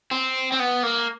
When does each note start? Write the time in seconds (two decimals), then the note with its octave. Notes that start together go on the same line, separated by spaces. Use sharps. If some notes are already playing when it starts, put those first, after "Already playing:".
0.11 C4
0.52 C4
0.59 B3
0.83 A#3